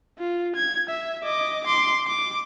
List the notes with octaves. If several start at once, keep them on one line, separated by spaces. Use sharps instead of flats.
F4
G#6
E5
D#5 D6
C6 D6
D6